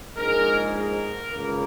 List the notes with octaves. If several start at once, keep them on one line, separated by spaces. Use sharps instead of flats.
A#1 G#2 G#3 A#4
A#4
C#2 C#3 A#3